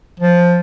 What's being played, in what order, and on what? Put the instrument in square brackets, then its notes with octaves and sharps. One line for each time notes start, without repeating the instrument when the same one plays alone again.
[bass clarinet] F3